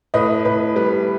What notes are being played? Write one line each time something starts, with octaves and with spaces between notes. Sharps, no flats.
A2 B4 D#5
A2 B4
G3 B4